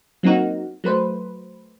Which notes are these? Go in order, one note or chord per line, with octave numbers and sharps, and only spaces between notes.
F#3 A#3 C4 D#4 F#4
F#3 A3 B4 C5